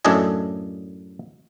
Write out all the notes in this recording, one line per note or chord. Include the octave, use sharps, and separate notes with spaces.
F#2 A2 D4 A4 D#5 G#5